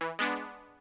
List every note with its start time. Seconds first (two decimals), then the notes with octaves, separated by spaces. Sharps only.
0.01 E3
0.19 G#3 B3 D4